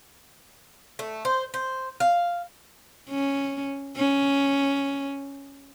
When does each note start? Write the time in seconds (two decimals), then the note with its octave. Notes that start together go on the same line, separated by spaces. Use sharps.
0.99 A3
1.25 C5
1.54 C5
2.00 F5
3.10 C#4
3.97 C#4